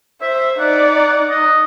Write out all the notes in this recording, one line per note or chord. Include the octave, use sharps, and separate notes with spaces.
C5 E5
D#4 D5 F#5
D#5